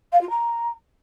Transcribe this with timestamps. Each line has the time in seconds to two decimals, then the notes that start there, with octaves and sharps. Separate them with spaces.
0.12 F5
0.21 F4
0.30 A#5